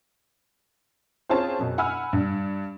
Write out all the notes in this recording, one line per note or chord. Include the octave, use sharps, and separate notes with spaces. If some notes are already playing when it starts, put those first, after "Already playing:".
C4 C#4 F4 G#4 C#5 A5
F#2 B2
F#5 G#5 B5 E6 F6
G2